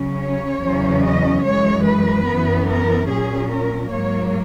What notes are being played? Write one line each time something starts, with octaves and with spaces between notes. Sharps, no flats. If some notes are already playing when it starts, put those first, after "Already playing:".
Already playing: C#3 F#3 C#4
C#5
E2 C#3 F#3 C#4
D#5
F#2 E3 G#3 C#5
B4
F#2 E3 B3
A#4
A#2 F#3 C#4 G#4
A#4
G#2 F#3 A#3 C#5